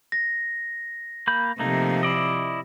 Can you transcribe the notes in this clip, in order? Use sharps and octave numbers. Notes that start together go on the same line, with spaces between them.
A#6
A#3 B5 G6
C3 F3 A3 A#3 D#4
E4 D5 D#5